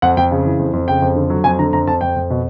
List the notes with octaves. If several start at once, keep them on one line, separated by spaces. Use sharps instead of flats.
F2 F#5
F2 G5
C#3
E3
F2
F2
C#3 G5
F2
D3
F#3
F2 G#5
D3 A#5
F2 A#5
F2 A5
F2 G5
F2
B2